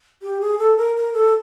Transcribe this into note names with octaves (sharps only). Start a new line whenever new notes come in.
G4
G#4
A4
A#4
A#4
A4